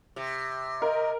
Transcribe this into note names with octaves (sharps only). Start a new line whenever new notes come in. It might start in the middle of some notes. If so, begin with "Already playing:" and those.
C3
A#4 D#5